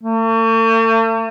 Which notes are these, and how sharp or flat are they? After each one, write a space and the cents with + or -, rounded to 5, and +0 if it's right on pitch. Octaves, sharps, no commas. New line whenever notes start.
A3 +45